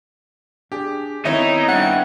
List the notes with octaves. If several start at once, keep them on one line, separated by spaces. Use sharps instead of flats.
D4 G4 G#4
D#3 B3 C4 D#4 E4 C#5 E5
G2 F#5